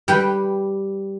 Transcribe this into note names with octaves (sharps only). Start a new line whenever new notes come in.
G3 G4 B4 G5